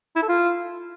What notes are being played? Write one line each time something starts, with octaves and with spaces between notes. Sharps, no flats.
E4
A4
F4